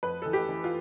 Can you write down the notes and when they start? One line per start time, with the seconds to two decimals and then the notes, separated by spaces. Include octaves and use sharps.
0.03 F2 B4
0.22 E3 A4
0.33 G4
0.49 E3
0.64 F4